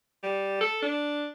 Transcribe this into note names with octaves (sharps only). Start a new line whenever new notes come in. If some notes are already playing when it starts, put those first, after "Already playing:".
G3
A4
D4